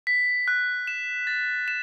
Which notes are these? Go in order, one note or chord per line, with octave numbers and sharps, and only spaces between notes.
B6
F#6
E7
A6
E7